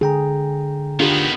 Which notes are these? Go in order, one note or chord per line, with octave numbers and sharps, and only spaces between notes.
D3 G#4 G5 A#5
D#3 B3 D4 F4 G4